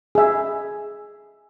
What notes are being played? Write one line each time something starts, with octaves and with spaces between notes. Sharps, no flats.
G#4 E5